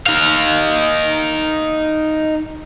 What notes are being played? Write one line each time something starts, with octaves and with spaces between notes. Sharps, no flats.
D#4 F5